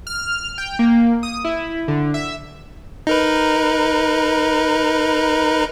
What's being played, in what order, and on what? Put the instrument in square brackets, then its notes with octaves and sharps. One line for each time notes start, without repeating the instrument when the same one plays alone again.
[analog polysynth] F6
G5
A#3
D#6
E4
D3
E5
[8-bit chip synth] D#4 A#4 B4